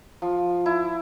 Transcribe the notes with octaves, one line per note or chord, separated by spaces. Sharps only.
F3
E4